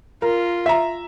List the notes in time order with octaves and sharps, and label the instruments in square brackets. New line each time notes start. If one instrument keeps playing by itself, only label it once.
[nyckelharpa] F4 [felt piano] A#4
[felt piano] E5 A#5